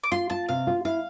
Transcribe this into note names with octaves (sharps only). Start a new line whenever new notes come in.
D6
F4 C6
F4 A5
C3 F5
F4
E4 F5